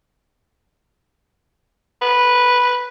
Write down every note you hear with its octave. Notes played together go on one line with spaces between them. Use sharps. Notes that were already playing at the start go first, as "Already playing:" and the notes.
B4